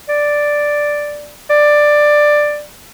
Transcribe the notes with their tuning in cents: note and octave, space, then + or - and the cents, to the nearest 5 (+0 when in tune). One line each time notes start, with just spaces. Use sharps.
D5 +0
D5 +10